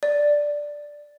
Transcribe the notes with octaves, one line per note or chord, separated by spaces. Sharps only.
D5